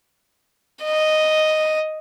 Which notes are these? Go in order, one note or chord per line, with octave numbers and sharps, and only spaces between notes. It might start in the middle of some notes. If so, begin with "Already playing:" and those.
D#5